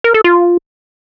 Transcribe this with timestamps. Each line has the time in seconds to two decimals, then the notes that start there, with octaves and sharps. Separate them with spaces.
0.04 A#4
0.14 A4
0.24 F4